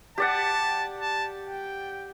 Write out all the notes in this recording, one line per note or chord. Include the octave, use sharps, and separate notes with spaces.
G4 D5 F#5 A5
A5
G5